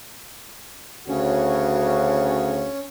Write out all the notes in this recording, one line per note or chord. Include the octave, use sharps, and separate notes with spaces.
D2 C#3 C#4 F#4